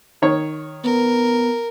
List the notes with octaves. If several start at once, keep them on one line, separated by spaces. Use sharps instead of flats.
D#3 C#5
B3 A#4